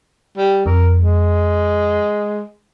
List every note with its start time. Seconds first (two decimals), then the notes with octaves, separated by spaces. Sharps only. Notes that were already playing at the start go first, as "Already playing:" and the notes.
0.37 G3
0.66 F2 A#4
0.98 G#3